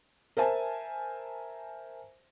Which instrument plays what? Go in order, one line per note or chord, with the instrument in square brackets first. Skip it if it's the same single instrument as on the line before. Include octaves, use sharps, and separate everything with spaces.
[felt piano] A#4 C5 E5 G#5 A5